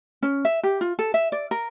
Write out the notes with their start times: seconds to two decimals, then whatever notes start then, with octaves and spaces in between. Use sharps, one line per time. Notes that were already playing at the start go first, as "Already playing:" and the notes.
0.23 C#4
0.45 E5
0.63 G4
0.81 F4
0.99 A4
1.14 E5
1.32 D5
1.51 A#4